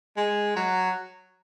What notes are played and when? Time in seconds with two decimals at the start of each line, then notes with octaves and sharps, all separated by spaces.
0.17 G#3
0.56 F#3